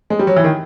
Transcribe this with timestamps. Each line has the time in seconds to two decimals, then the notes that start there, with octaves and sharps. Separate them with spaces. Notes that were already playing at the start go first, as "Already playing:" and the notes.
0.10 G#3
0.19 G3
0.27 F#3
0.36 E3
0.44 D#3